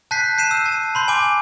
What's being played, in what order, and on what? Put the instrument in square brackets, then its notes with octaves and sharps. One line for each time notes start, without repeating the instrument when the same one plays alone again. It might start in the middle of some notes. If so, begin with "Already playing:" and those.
[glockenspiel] A5 F#6 G6 B6 C7
G6 C7 D#7 E7
E6
A5
B5 C6 G6
G#5 D6